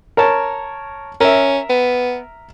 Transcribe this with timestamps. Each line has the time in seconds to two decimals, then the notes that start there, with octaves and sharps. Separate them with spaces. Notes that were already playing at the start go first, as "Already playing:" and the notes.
0.17 A#4 C#5 A5
1.21 C#4 A#4 E5
1.69 B3